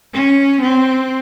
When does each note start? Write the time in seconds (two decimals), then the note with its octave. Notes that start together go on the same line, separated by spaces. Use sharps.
0.12 C#4
0.62 C4